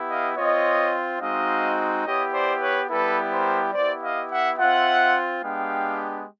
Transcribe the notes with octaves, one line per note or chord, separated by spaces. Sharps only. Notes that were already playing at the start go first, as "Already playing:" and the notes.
Already playing: B3 E4 G4
D#5 F5
C4 F4 C#5 D#5
G#3 C4 D#4 F#4 D#5 F5
B3 E4 G4 C#5 D#5
C5 D5
B4 C#5
G3 B3 E4 G4 A4 B4
A#4 C5
B3 E4 G4 C5 D5
D#5 F5
E5 F#5
C4 F4 E5 F#5
G#3 B3 D4 G4 F5 G5